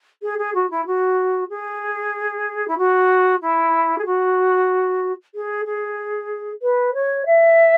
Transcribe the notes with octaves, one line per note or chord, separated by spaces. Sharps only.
G#4
G#4
F#4
E4
F#4
G#4
E4
F#4
E4
G#4
F#4
G#4
G#4
B4
C#5
E5